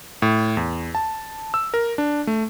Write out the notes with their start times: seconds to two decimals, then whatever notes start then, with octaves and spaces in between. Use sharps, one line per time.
0.22 A2
0.57 E2
0.95 A5
1.54 E6
1.74 A#4
1.98 D4
2.27 A3